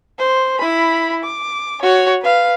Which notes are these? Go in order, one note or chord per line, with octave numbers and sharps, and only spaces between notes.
C5
E4 B5
D6
F#4 C#5
B4 F5